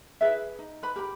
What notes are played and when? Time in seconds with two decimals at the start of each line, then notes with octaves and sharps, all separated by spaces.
0.21 E4 G#4 B4 E5
0.59 D#4
0.83 B4 B5
0.96 G4 A#4 B5